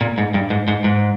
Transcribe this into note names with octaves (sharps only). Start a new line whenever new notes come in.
A#2
G#2
G2
G#2
G#2
G#2